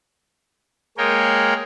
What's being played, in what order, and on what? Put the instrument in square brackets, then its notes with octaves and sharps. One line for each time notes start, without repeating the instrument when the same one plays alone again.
[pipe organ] G#3 A#3 G#4 A#4 C#5 G5